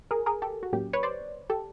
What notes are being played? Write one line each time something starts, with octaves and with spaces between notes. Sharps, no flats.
G#4 A#4
G#4 A#4
G4 A4
F#4
A2 F#3 A#3 C#4 G4
B4 C#5
C5 D5
G4 A4